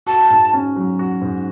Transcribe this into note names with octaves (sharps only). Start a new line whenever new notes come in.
F#4 A5
G#2
C#4
F#3
F#4
G#2